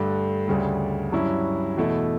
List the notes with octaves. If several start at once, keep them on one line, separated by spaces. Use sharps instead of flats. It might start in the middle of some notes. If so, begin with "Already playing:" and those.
Already playing: G2 D3 A3
D2 C#3 G3
G2 F#3 C#4 E4
E2 B2 A3 E4